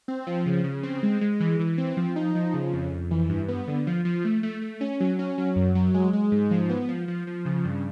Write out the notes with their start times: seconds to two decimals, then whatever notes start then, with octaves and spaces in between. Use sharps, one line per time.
0.08 C4
0.27 F3
0.46 C#3
0.64 C#3
0.83 C4
1.03 G#3
1.21 G#3
1.40 E3
1.59 E3
1.78 C4
1.97 F3
2.16 D#4
2.35 F3
2.54 C#3
2.73 F2
2.92 F2
3.11 E3
3.30 G2
3.48 B3
3.68 D3
3.87 F3
4.05 F3
4.25 A3
4.43 A3
4.62 A3
4.81 C#4
5.00 F#3
5.19 C#4
5.38 F#3
5.56 F#2
5.75 F#3
5.94 G#3
6.13 G#3
6.32 G#2
6.51 F3
6.69 B3
6.89 F3
7.08 F3
7.27 F3
7.46 C#3
7.65 G2